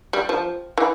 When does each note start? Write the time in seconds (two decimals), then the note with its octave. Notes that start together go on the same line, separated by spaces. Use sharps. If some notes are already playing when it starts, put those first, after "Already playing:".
0.13 G3
0.29 F3
0.78 E3